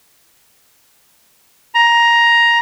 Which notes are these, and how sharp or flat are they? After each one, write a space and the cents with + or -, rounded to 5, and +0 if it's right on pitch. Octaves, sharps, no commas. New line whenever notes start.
A#5 +10